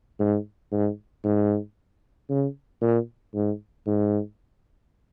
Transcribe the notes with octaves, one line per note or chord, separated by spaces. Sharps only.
G#2
G#2
G#2
C#3
A#2
G#2
G#2